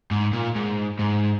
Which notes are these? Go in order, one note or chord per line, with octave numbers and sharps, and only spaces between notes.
G#2
A#2
G#2
G#2